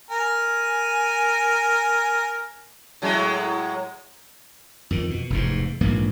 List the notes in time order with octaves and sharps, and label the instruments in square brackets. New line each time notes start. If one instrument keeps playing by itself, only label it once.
[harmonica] A#4 G#5
[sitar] A2 F#3 G#3
[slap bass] F2 D#3
B2
F1 E2 G#2
A#1 G#2 E3 A#3